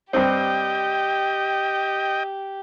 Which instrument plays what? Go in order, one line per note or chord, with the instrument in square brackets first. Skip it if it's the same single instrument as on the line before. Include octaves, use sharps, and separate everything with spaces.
[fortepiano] G2 C4 [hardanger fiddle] G4 [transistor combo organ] D#5 G5